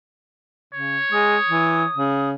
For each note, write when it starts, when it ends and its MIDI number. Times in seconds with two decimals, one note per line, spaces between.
0.73 0.99 49
0.73 1.92 73
1.12 1.36 56
1.12 2.29 87
1.49 1.85 52
1.96 2.34 49